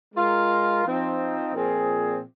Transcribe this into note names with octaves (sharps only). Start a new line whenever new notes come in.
G#3 F4 A#4
F3 C4 D#4
A#2 F3 C4 G#4